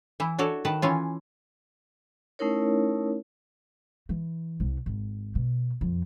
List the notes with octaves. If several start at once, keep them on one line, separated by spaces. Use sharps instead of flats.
E3 E4
D4 F#4 A4 C#5
D#3 B4 A5
E3 C#4 F4
A3 C#4 D#4 E4 A#4 C#5
E3
C2
G#1
B2
F2